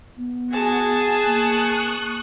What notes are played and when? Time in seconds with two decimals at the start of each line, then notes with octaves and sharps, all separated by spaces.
0.17 B3
0.53 F#4 G#4 A5
1.26 A#3 C#6 D#6 F#6